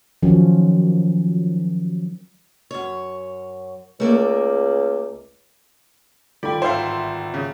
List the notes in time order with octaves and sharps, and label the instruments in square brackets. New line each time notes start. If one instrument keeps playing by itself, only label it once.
[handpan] D#3 F3 F#3 C#4
[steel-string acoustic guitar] F#2 C#5
[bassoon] C#2 [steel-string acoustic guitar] A3 A#3 D5
[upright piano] G1 D#3 A4 [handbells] F4 G5 [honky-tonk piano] D5 B5
[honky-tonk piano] G#1 E5 [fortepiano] C5 F5
[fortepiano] C#3